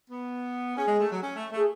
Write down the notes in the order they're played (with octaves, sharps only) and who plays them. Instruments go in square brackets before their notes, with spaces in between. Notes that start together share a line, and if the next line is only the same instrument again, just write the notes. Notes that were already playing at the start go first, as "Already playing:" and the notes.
[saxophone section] B3
[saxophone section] C#4 [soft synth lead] G#4
[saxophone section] G#3
A3
F#3
C#4
A3
A3
[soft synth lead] G#4